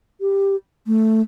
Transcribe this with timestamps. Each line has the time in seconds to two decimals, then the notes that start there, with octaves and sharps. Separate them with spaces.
0.21 G4
0.87 A3